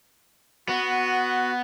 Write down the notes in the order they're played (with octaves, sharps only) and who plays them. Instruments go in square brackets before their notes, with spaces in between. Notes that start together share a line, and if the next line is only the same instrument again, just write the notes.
[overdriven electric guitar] B3 [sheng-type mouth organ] F#4